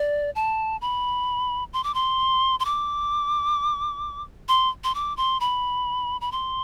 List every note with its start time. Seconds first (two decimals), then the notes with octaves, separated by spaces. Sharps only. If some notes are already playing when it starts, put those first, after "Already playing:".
Already playing: D5
0.35 A5
0.81 B5
1.73 C6
1.83 D6
1.94 C6
2.60 C6
2.65 D6
4.48 C6
4.84 C6
4.95 D6
5.17 C6
5.40 B5
6.21 B5
6.32 C6